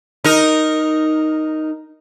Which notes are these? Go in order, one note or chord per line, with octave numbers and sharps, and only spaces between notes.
D#4 A#4